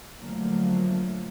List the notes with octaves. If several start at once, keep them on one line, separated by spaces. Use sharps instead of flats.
D3 F3 F#3 A3 A#3